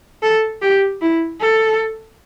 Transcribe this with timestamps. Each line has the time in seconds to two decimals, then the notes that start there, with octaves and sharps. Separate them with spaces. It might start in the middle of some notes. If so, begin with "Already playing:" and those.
0.22 A4
0.62 G4
1.02 E4
1.41 A4